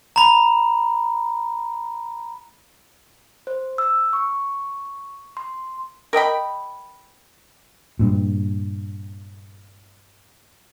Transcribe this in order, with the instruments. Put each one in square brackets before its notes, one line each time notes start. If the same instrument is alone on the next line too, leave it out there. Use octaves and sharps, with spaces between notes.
[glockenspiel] A#5 B5
[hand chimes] C5
E6
C#6
C6
[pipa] A#4 D#5 G5 B5
[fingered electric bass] G2 A#2